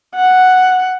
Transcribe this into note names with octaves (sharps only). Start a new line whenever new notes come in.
F#5